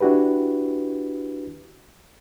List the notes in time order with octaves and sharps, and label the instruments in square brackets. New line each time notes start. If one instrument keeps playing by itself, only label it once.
[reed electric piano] D4 E4 F#4 G4 B4